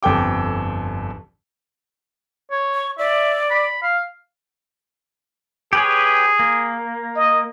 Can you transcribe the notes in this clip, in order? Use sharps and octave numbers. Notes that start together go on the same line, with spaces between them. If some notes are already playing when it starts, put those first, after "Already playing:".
G1 F2 A4 G5 D6
C#5
C#6
D5 E5
B5
F5
G4 G#4 B4 C#5
A#3
D#5